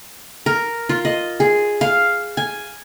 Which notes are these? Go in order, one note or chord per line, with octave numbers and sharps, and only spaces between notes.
A#4
F4
D#5
G#4
F5
G#5